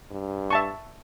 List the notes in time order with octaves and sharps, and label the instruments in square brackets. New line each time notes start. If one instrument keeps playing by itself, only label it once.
[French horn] G2
[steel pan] E5 A5 C#6